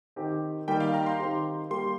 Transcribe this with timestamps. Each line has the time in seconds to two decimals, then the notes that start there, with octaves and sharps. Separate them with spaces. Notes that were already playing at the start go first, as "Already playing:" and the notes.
0.16 D#3 C4 G4
0.68 D#3 G3 A#3 G4 G5
0.80 F5
0.94 A#5
1.06 C6
1.19 D#3 C4 G4
1.70 G3 A#3 G4 C6